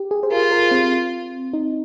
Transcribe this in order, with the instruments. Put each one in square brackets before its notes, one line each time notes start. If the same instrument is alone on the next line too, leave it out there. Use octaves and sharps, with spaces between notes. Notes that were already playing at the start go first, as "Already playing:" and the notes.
Already playing: [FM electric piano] G4
G#4
C5
[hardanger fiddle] F4 [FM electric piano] A#4
[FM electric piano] A#4
C4
D#4